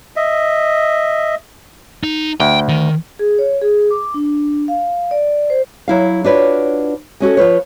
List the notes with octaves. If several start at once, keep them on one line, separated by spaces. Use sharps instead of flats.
D#5 E5
D#4
D2 G5
D#3
G#4
C#5
G#4
D6
D4
F5
D5
C5
F#3 E4 F5
D4 F4 F#4 B4 C#5 D5
G#3 C#4 F#4 A4
F3 F4 B4 C#5